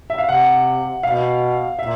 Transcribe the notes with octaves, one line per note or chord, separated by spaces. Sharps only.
E5
F5
C3 F#5
B2 F5
A#2 E5